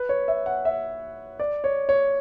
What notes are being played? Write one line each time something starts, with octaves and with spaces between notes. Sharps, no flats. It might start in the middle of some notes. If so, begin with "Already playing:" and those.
Already playing: B4
C#5
E5
F#5
E5
D5
C#5
C#5